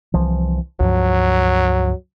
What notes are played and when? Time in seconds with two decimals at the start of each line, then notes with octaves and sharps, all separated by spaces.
0.14 C2 E3 F3
0.80 C#2 G2 F3 F#3